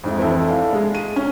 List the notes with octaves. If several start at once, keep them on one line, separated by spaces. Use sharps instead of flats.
F2 G#2 E5
F2 E3 E4 A4
E4 A4 D5 F5
G#3 G#4
D#7
C#4